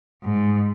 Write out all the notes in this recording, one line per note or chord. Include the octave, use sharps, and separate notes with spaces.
G#2